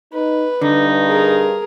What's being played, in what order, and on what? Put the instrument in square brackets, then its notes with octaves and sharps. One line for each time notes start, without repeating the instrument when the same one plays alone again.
[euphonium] D#4 [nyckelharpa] B4
[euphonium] G2 [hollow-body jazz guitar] D3 [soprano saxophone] D#4
[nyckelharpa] G#4 A#4